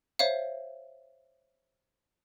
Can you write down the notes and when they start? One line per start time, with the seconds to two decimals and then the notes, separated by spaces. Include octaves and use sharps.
0.19 C5 C#5 E5 F5